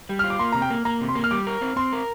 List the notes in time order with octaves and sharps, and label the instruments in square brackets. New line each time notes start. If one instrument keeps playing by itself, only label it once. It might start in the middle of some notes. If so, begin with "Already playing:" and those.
[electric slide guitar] G3
[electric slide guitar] F4 [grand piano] F6
[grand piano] D6
[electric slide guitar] A#3 [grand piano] C6
[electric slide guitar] C3 [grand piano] A#5
[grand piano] G5
[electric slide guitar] A#3
[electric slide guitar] A#3 [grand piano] A#5
[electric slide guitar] C3
[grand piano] C6
[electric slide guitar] A#3
[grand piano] F6
[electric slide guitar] G3 [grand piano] D6
[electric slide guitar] A#4
C4
[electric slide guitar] C4 [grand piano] C6
[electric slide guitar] A#4